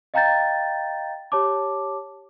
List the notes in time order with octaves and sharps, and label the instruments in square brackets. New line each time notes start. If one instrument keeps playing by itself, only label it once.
[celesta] D#5 F5 G5 A#5 G6 A6
G4 C#5 A5 D6